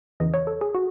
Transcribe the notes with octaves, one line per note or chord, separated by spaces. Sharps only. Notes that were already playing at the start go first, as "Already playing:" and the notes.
E2 C#3 E3 D#5
C#5
A4
G#4
F#4